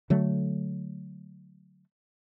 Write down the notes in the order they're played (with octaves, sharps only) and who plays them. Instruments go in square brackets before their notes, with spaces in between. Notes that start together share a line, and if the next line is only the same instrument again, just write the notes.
[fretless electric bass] D3 F#3 A3